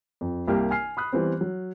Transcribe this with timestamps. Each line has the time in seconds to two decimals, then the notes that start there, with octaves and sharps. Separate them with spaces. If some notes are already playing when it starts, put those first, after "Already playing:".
0.21 F2
0.48 C2 A#3 G4 F6
0.71 G#5 F6 C7
0.97 B5 D#6 F#6
1.13 E3 G3 B3 C4
1.41 F#3